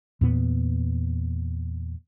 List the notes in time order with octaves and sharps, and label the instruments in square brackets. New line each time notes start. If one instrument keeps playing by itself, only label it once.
[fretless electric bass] E2 A#2 B3